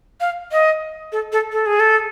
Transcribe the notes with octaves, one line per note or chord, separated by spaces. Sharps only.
F5
D#5
A4
A4
A4
G#4
A4